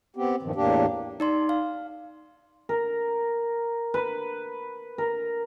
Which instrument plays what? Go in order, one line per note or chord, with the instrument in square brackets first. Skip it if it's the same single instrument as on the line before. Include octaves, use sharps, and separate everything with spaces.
[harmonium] B3 C4 G4
G2 A#2 D#3 F3
E2 A2 A#3 D4 G4
[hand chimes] D#4 D5 C6
F5
[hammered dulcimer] A#4
B4
A#4